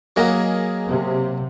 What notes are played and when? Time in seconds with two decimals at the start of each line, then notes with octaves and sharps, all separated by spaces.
0.16 F#3 A#3 G#4 A#4 D#5 F#5
0.88 C3